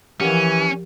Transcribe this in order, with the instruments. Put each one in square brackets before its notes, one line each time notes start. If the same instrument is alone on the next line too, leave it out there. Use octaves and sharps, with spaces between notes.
[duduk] E3 [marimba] F3 A#4 F#5 [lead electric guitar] C#4 [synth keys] G4